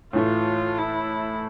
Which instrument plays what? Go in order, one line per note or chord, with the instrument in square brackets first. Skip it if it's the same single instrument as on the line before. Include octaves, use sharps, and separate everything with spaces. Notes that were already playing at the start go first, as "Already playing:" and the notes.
[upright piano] A2 E3 A3 [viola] F4
[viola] E4